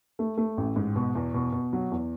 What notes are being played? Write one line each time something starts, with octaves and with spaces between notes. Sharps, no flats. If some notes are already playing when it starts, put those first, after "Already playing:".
A3
A3
A1
G#2
B2
E2
B2
B2
F#3
E2